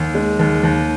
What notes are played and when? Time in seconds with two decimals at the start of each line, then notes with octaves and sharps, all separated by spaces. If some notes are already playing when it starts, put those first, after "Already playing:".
Already playing: D#2
0.15 G#3
0.39 D#2
0.63 D#2